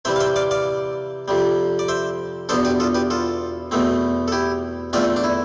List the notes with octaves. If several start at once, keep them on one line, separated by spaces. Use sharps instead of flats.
C3 E3 G3 C5 E5
F5
C5 E5
D5 F5
D5 F5
F2 C3 G3
D5
C5 E5
E2 B2 B3 D4 A4 C5
G4 B4
F4 A4
G4 B4
F4 A4
E2 B2 A3 C4
A4
E4 G4
E2 D3 A3 C4 D4 F4
D4
E4